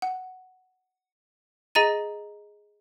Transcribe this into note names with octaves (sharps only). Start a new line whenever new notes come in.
F#5
G#4 D#5 A#5 A6 D#7